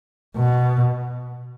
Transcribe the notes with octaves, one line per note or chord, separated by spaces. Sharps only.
B2